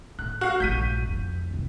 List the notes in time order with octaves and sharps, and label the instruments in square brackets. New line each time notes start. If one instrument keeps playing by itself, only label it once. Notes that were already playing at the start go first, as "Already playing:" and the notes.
[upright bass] A2 [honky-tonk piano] F#6
[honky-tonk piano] F#4 F5
[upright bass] A#1 G2 [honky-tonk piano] G6 B6 D#7
[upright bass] F2
C2 C3